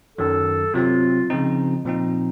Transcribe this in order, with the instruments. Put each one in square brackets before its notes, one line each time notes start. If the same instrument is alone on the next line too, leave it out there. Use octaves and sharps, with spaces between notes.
[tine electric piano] F#2 D#3 F#3 [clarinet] A4
[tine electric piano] C3 F#3 C4 [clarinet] F4
[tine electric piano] C#3 F3 C4 D#4
A#2 F3 C4 D#4